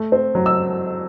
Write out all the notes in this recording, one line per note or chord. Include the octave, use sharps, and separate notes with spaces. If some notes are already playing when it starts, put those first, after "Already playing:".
Already playing: A3
C4
F#3
E6